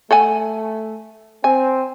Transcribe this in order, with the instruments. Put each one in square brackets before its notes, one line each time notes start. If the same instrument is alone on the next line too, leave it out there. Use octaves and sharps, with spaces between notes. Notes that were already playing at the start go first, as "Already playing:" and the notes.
[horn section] A3 [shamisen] A4 F#5 G#5
[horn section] C4 [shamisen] G#5